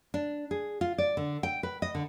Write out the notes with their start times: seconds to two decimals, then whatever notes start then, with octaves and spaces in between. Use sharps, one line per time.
0.14 D4
0.51 G#4
0.81 F4
0.98 D5
1.17 D3
1.43 G5
1.63 B4
1.82 D#5
1.95 D3